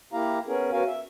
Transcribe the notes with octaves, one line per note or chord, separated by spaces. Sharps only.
A#3 E4 G4 F5 A#5
B3 C#4 G#4 A#4
B3 C#4 F#4 A#4 F5 G#5
E5